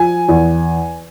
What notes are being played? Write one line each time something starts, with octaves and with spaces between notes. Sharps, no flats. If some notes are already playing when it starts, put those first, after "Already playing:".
Already playing: F3 G#5
E2